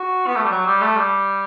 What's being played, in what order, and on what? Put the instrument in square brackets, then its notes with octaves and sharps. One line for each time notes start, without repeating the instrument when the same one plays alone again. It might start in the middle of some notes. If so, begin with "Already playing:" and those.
Already playing: [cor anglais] F#4
B3
A3
G3
F#3
G3
A3
G3